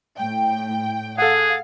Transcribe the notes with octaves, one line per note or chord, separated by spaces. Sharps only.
A2 G5
G#4 A4 F5 F#5